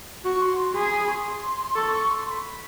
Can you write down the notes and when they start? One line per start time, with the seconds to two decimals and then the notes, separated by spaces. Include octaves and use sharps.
0.24 F#4 C#6
0.41 C6
0.58 C6
0.75 G#4 B5
0.91 B5
1.08 C#6
1.12 C6
1.75 A4 C#6
1.92 C#6
2.10 C6
2.26 C6
2.31 B5